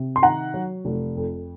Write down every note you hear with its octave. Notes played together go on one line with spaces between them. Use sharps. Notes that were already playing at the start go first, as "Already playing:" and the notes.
Already playing: C3
C6
D#3 F#5 A#5
F#3
F1
F2